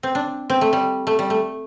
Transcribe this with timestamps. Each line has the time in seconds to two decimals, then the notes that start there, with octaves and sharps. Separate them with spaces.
0.03 C4
0.15 D4
0.50 C4
0.61 A3
0.73 G3
1.07 A3
1.19 G3
1.30 A3